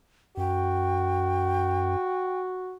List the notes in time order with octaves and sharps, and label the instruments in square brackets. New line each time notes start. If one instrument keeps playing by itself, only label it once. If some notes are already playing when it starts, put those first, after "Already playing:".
[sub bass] F#2 [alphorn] F#4 [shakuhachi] G5